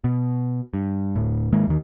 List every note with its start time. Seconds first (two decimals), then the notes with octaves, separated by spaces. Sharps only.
0.04 B2
0.74 G2
1.16 D1 A2
1.52 G#2 D#3 G#3 A#3
1.67 D#2 D#3